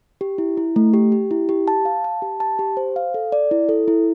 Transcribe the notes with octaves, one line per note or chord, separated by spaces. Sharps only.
G4
E4
E4
A3
G4
G4
E4
G4
A5
F5
A5
G4
A5
G4
C5
F5
A4
D5
E4
A4
E4